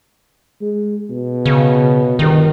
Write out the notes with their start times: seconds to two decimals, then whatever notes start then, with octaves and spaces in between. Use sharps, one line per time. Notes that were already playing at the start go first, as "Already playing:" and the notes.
0.61 G#3
1.10 B2
1.46 C#3
2.19 G1 D#3